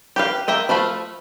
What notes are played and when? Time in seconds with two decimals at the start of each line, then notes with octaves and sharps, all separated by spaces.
0.16 G4 B4 F5
0.48 A#3 D#5 E5 G5
0.69 F3 A3 F5 B5